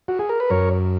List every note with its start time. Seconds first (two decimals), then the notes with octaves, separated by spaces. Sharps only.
0.08 F#4
0.19 G#4
0.29 A#4
0.40 B4
0.50 F#2 A#4 C#5